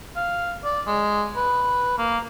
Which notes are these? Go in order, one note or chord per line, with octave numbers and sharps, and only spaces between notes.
F5
D5
G#3
B4
A#3